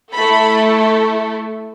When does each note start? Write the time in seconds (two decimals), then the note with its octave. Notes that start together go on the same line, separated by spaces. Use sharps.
0.13 A3 E4 A4 B5